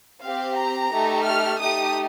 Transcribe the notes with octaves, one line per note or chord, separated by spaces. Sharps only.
C4 G4 F5
A#5
A3 D#4 G4
F6
A3 D#4 G4 D#6